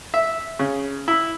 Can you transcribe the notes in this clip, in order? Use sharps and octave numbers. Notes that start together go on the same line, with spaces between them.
E5
C#3
E4